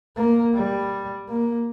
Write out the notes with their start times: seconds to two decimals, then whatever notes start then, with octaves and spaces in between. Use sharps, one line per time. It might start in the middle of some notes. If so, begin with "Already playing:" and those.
0.17 A#3
0.55 G3
1.29 A#3